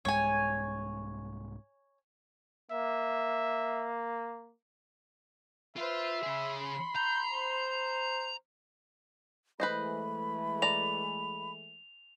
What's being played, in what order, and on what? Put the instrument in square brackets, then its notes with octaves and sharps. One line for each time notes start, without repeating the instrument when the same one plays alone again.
[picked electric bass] C2 G#2 G#3 [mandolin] C#5 G#5
[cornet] A#3 [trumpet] E5
[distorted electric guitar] F4 [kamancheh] B4 C5 [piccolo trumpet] E5
[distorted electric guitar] C#3 G#4 [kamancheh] B5 C6
[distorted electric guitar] A#5 [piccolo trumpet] G6
[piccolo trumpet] C5
[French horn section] E3 G#3 A3 [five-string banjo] B4 C5 D#5 [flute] B5
[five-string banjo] D5 A#5 [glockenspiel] F7